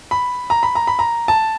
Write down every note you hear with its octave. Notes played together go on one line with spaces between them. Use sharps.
B5
A#5
B5
A#5
B5
A#5
A5